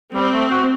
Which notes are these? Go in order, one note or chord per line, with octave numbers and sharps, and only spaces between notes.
G3 C4
A3
F#4